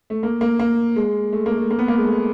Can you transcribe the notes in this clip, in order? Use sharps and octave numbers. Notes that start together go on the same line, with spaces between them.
A3
A#3
A#3
A#3
G#3
A3
A#3
A3
A#3
B3
A#3
G#3
A3